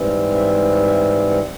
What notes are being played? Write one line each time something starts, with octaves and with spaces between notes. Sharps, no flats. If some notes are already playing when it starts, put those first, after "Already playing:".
Already playing: G#2 E3 G3 C4
E5
E5
F#5